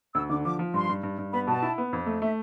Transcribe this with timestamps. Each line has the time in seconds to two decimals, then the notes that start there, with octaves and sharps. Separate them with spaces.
0.15 D2 E6
0.30 D3 D6
0.45 F3 D6
0.59 F3
0.74 G2 C6
0.89 G2
1.03 G2
1.18 G2
1.33 B3 B5
1.47 B2 A5
1.62 E4
1.78 B3
1.93 F2
2.06 A3
2.22 A3 E5